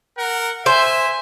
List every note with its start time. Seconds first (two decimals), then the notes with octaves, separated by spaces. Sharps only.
0.18 A#4 F#5
0.66 C5 E5 G#5